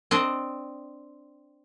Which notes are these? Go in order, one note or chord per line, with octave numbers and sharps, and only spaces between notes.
C4 D4 D#5